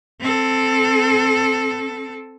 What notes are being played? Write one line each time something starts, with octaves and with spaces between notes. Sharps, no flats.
C4 A4